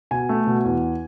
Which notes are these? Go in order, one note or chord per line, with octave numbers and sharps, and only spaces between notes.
B2 G#5
A3
B2
E2